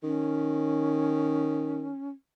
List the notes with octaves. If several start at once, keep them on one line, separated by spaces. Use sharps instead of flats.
D#3 C#4